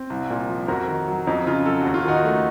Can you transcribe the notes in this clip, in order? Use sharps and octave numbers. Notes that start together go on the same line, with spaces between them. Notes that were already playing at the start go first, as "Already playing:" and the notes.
Already playing: C4
C2
A#2
F3
F2 F#4 A#4
D#3
F#3
F2 D#4
C#3 F4
F#3 A4
D#2 F#4
F4
D#3 D#4 F#4
A3